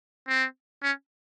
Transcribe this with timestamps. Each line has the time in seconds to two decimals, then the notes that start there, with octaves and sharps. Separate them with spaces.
0.28 C4
0.83 C#4